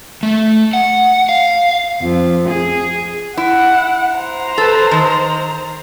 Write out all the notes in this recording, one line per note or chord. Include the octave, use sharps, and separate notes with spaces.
A3
F#5
F5
F2
G#4
E4 F#5
C5 A#5
A4 B4
D#3